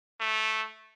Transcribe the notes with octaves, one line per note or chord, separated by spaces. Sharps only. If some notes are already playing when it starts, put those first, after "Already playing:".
A3